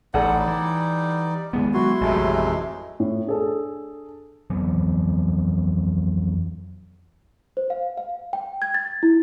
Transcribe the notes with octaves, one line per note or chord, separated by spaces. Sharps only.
A1 G3 D#4 A4 D5 F#5
E3
E2 D#3 G#3 B3
F#3 E4 F#4 C6
A1 F2 A2 C3 G#3 A3
A2
D4 G#4 A4
F2 E3 F#3 B3
C5
F5
F5
G5
G#6
A6
E4